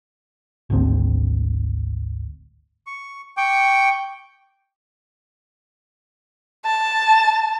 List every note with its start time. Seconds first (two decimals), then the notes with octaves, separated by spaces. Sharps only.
0.70 G#1 D2 C4
2.87 C#6
3.37 G5 C#6 D6
6.65 A5